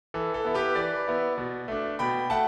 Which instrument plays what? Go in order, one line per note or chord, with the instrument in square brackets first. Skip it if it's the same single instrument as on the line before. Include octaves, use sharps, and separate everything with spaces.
[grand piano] E3 A4
A4
B3 E4
G4 B4
E3 B4 D5
B3 E4
B2
A3 D4
B2 G5 B5
A3 F#5 A5